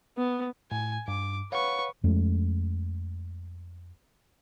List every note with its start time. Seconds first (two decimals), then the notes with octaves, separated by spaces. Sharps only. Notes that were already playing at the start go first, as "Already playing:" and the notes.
0.17 B3
0.72 A2 G#5
1.08 G2 D6
1.52 B4 C#5 F5 F#5 C#6
2.04 F2 G#3 A3 C#4